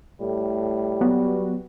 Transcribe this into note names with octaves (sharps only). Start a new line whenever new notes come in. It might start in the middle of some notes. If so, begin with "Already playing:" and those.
A2 G3
F#3 B3 F#4